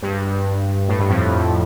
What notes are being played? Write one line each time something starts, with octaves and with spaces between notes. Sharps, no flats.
G2
A2
G2
F2 A2